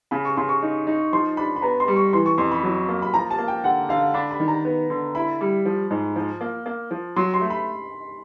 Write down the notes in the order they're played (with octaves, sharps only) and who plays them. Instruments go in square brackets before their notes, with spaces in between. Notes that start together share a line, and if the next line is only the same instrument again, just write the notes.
[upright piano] C#3 [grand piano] B5
[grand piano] C#6
[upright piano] C#3 [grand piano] C6
[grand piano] C#6
[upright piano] D#4
D#4
[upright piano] F3 [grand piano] C6
[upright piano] D4 [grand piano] B5
[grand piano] B5
[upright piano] B3 [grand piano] A#5
[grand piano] C6
[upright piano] G3
[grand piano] C#6
[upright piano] E3 [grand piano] C6
[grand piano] C#6
[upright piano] F2 [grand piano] C6
[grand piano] B5
[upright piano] F#3
A#3
[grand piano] B5
[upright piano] F3 [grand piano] A#5
[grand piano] A5
[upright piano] A#3
[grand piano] G5
[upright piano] D3 [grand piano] F#5
[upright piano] D3 [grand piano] F5
[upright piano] D4 [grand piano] B5
[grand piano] B5
[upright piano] D#3
[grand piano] A#5
[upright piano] B3
D3
[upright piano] E4 [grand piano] B5
[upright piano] G3
F3
G#2
F3
A#3
A#3
F3
[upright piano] F#3 [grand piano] C6
[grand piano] C6
[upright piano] A3
[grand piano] B5